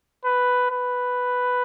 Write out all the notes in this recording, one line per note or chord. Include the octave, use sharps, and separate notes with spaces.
B4
B4